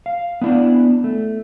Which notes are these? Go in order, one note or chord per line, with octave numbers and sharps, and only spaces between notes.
F5
B3 D4 E4 D5
A3